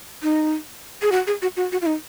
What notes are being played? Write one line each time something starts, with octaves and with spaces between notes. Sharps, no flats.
D#4
G#4
F#4
G#4
F#4
F#4
F#4
F4
D#4